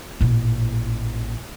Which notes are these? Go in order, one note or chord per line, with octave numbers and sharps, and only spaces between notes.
A1 A#2